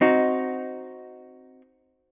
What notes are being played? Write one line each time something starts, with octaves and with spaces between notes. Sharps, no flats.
C4 D#4 F#4